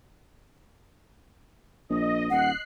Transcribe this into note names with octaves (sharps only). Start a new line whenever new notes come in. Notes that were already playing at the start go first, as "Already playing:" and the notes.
A#1 D#5
D#1 F#5 F#6 C7